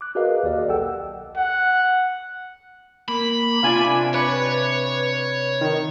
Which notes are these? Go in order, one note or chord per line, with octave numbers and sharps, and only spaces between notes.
D6 F#6
F#4 G#4 A#4 B4 D#5 F5
D#2 G4 D5 D#5
B1 A4 F#5 G5 E6
F#5
A#3 B5
C3 D4 F4 D5 G#5
B4 C#5
D#3